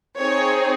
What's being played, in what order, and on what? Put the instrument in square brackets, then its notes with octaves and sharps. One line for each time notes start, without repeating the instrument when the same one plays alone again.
[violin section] C4 D#4 G#4 C#5